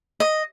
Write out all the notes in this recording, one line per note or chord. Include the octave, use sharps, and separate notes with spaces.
D#5